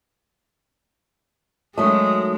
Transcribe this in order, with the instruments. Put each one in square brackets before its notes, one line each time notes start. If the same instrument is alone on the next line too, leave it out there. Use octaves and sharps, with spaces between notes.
[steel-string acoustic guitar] D#3 F#3 A3 [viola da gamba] G#3 [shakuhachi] D#6